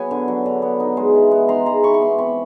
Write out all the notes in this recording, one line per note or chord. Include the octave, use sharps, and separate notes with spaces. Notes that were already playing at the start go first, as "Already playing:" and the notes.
Already playing: F#3 B3 G#5
D3
F#3
D3
B3
D#4
G#3
E3
B3
D#4 A#5 C6
G#3 A#5 C6
E3 B5 C#6
C#6
B3 C6 D6
C4 B5 C#6